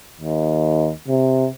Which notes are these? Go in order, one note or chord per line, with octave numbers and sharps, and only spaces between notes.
D#2
C3